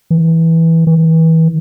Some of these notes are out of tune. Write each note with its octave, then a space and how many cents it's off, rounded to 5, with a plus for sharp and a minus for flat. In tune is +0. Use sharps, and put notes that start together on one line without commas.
E3 -10
E3 -30